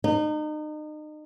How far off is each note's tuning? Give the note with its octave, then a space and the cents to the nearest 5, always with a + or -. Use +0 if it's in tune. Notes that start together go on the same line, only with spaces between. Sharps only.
D#4 -35